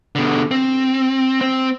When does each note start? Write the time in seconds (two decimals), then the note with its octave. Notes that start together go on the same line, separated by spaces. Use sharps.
0.15 B2 D3
0.51 C4
1.41 C4